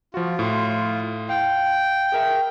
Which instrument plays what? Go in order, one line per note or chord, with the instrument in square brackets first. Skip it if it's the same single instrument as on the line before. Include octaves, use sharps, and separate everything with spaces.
[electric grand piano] F3 F#4 [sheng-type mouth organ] F4
[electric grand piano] A2 C6
[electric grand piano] F5 [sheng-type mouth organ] G5
[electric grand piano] G#4 A#4 E5